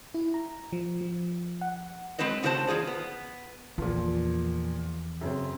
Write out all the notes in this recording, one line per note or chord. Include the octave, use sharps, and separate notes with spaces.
E4
A#5
F3
F3
F#5
F#3 G#3 C4 B4 C5 D#5
A2 C#3 F4 F#4 C5 A5
E2 F4 G#4 D5
B3
E2 A#2 F3
F#2 C#3 C4